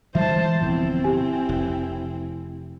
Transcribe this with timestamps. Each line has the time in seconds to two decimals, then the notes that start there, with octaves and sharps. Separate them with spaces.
0.15 E3 G3 G#3 C5 E5 A5
0.60 D1 B2 F3 C4 E4
1.04 G4 G#5
1.49 F1